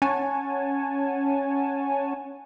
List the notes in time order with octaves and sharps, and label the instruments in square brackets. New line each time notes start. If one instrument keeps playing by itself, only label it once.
[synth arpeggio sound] C#4 C#5 F#5 G#5 A5